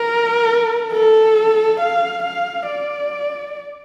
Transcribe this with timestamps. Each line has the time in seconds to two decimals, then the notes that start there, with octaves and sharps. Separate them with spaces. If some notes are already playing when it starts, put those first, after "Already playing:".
Already playing: A#4
0.93 A4
1.80 F5
2.23 F5
2.67 D5